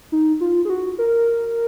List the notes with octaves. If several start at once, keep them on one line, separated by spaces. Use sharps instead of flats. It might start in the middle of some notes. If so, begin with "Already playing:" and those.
D#4
F4
G#4
F#4
A#4